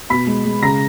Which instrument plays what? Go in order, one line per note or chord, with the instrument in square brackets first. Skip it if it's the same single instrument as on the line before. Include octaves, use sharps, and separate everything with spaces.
[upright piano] B2 B5 B6
G#3
G#3
C#3 A#5 A#6